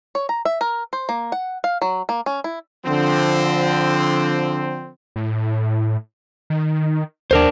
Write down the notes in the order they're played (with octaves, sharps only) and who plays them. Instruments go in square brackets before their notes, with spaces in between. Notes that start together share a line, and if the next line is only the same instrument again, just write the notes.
[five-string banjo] C#5
A#5
E5
A#4
C5
A#3
F#5
F5
F#3
A#3
C#4
E4
[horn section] D3 F3 C4
[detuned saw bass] A2
D#3
[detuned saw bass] D#2 [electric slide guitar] D4 A#4 C5